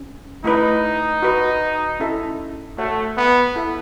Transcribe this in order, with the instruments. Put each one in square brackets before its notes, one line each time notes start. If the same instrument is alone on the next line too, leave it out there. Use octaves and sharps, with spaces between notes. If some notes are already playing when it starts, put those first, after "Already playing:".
Already playing: [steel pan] C#4
[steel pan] A3 E4 B4 D#5 [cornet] D#4
[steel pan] F#4 B4 D#5
C#4 E4 A4 E5
[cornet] A3 [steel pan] F#4 C#5 F#5
[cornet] B3
[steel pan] E4 A4 E5